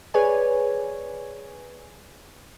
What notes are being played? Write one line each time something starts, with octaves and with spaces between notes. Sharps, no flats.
G#4 B4 C#5 D5 G#5